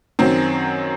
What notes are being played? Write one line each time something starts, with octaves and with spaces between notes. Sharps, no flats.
F#2 D#3 F#3 C4